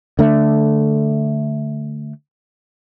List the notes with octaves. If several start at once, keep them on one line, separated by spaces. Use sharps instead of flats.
D3 A3